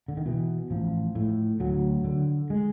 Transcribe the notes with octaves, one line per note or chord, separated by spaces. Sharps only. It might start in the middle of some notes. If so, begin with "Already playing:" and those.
D3
D#3
B2 E3
A1 F3
A2
D2 F#3
D3
G#3